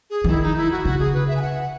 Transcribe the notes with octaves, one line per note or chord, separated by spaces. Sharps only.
G#4
E3
D#3 E4
D#4
E4
F#4
C#3 F#4
G#4
B4
E5
G#5
F#5